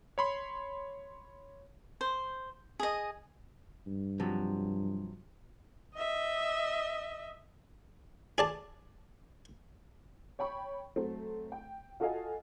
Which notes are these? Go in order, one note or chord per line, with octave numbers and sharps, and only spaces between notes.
C#5 B5 C6
C5
G#4 D#5
G2
C3 F3 F#3
D#5 E5
G#4 D5 A5
C#5 G5 B5 C#6
F#3 A3 C4
G5
F4 F#4 A4 D#5 F5 G#5